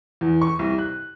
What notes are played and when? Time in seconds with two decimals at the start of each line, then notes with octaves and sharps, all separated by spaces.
0.21 E2
0.42 C#6
0.59 C2
0.78 F#6